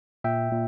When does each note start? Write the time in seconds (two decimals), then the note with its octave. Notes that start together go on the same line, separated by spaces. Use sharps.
0.24 A#2 E5 G5
0.51 A#2